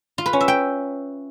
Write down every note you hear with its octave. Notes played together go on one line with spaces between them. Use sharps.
F4
B4
C#4
E5
G5